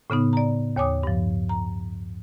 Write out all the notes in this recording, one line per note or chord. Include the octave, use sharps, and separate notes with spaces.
A2 C#3 B3 D#4
D5 A#5
D#2 C#5 G#5 D6 D#6
G2 F3
A#5